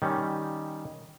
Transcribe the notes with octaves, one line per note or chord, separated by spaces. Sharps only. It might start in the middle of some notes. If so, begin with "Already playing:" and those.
D#3 G3 C#4